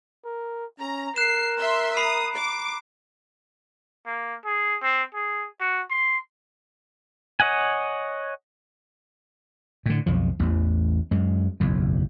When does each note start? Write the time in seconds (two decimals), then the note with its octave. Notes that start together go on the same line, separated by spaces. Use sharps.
0.25 A#4
0.79 C#4 A#5
1.16 A#4 F#6 C7 E7
1.58 E5 C6
1.97 A#5 B5 D#6 C7
2.34 D6
4.06 A#3
4.45 G#4
4.82 C4
5.14 G#4
5.60 F#4
5.90 C6
7.40 C#5 D#5 F#5 G#5
9.86 A2 D3
10.06 B1 F2 F3
10.39 A1 E2
11.11 F#2 G#3
11.60 F#1 B1 E2